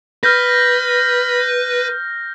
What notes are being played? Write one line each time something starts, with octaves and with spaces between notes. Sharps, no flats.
B4 F6 G6 A#6